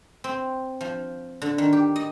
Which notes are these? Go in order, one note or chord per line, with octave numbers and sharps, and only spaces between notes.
C4
F3
D3
D#3
G4
D#5